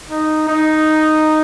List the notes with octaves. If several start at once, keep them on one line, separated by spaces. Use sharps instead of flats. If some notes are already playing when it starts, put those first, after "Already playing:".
D#4
D#4